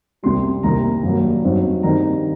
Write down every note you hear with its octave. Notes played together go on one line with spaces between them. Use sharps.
C2 C3 G3 C6
C2 C3 D#3 G3 A#3 A#5
G2 F#3 A#3
G2 F#3 C4 D#4
G2 D#3 G3 C4 D#4 A#5